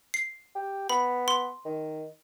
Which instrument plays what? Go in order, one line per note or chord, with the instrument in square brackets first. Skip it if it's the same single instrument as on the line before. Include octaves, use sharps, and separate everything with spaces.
[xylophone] C7
[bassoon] G4
[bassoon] B3 [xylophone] B5
[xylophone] C6
[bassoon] D#3